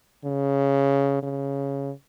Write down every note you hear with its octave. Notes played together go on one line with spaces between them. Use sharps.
C#3
C#3